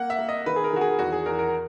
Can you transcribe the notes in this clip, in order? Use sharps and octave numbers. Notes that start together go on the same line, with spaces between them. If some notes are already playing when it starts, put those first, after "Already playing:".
Already playing: A#3 F#5
E5
A#3
D#5
D#3 B4
G#4
A#4
D#3 F#4
G#4
E2 F#4
G#4
E2 A#4
A#4